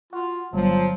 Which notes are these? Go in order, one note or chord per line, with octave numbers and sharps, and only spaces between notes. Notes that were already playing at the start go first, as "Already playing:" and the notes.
F4 F#4
G1 F3 F#3